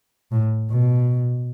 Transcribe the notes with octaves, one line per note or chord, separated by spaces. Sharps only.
A2
B2